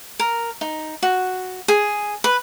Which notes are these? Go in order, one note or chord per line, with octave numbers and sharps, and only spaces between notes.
A#4
D#4
F#4
G#4
B4